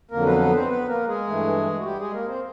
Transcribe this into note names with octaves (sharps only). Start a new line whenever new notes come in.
F2 D3 F#3 A#3 A#4
B3 B4
B3 B4
C4 C5
B3 B4
A#3 A#4
G#3 G#4
G2 E3 A3
F#4
G3 G4
G#3 G#4
A#3 A#4
C4 C5